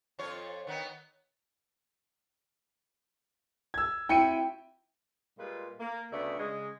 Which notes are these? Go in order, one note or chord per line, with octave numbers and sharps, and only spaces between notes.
F2 F4 C#5
D#3 B3 D#4
E6 G#6
C4 E4 F#4 G5 C#7 D#7
A#2 G3 G#3 F4 B4
A#3
D2 C#3 B3 D5 E5
C#3 G#3